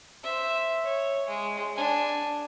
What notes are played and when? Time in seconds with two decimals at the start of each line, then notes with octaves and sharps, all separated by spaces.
0.23 C5 E5
0.84 C#5
1.28 G#3
1.75 D4 G#5